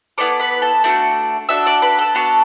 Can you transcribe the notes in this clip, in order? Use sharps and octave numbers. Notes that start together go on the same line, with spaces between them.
B3 E4 A4 D5 D6
B4 B5
A4 A5
A3 D4 F#4
D4 F#4 A4 E5 E6
D5 D6
B4 B5
A4 A5
B3 D4 F#4